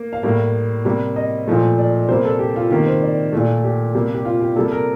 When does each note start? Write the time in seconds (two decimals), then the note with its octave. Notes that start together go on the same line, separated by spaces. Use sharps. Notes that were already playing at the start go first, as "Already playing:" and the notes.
Already playing: A#3
0.13 F5
0.23 A2 G3 A#3
0.85 C3 G3 A#3
1.16 D#5
1.47 A#2 F3 A3
1.78 D5
2.09 C3 G3 A#3 C5
2.25 A4
2.39 G4
2.56 F4
2.70 C3 D#3 A#3 G4
2.86 C5
3.02 D5
3.33 A#2 A3
3.64 G4
3.95 C3 G3 A#3
4.14 G4
4.25 F4
4.41 G4
4.56 C3 G3 A#3 A4
4.72 A#4